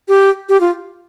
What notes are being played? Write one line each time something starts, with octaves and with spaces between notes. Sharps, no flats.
G4
G4
F4